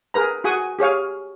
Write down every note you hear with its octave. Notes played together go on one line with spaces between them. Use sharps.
G#4 A#4 B4 A#5
F#4 G#4 F#5 G#5 D#6
G4 G#4 C#5 F5